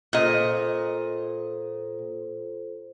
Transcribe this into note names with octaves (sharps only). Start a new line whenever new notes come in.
A#2 F4 A4 C5 D#5